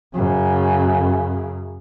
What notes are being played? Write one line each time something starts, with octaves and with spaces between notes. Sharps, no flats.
F#2 C#3